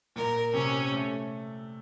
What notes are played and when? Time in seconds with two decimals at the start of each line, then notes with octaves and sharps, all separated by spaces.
0.16 A#2 A#4
0.53 C3 C#4
0.92 A3